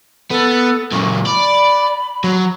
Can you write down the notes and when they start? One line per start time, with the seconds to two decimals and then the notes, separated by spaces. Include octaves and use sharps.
0.30 B3 A4
0.92 F#2 A#2 C#6
1.27 D5 B5
2.24 F#3